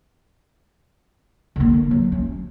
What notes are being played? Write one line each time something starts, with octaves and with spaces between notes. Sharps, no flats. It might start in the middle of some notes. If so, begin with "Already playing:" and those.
D3 A#3
F#3
C#4